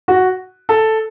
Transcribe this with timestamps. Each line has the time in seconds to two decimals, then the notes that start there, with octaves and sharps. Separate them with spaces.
0.08 F#4
0.69 A4